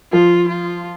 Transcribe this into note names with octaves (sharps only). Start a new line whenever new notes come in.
F3 F4
F4